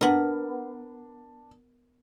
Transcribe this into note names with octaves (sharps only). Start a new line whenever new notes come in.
B3 D4 A#4